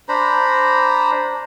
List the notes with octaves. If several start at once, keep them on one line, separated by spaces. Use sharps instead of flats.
D4 C5 A#5 B5